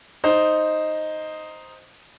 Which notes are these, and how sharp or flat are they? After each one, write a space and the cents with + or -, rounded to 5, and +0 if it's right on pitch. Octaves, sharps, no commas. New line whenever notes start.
D#4 +0 C5 +0